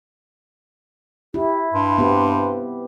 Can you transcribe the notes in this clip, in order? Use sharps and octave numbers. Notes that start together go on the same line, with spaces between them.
E4 G4
G2 C6
B3 C4 G4